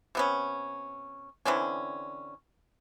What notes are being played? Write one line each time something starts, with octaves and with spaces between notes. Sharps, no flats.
C3 B3 C#4
D3 E3 C4 C#4